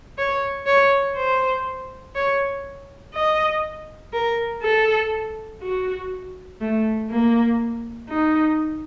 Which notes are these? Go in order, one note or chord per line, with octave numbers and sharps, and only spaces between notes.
C#5
C#5
C5
C#5
D#5
A#4
A4
F#4
A3
A#3
D#4